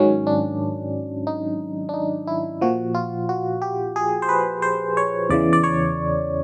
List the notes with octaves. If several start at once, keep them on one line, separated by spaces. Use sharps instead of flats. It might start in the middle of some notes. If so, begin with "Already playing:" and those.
Already playing: G#2 D#3 F#3 C#4
D4
D#4
D4
D#4
E4
A#2 F3 F#4
F4
F#4
G4
G#4
C5
B4
C5
C#5
E2 C#3 E3 D5
D5
C#5